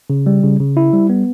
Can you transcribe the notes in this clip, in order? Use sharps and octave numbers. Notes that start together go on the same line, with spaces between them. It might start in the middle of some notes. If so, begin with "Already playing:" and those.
C#3
G3
C#3
C#3
E4
G3
B3